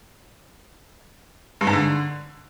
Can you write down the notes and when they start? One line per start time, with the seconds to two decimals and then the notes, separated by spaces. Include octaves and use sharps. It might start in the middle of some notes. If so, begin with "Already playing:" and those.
1.61 G2
1.67 G#2
1.73 D3